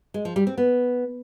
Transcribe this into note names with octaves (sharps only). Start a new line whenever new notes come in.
G#3
F3
G3
C4
B3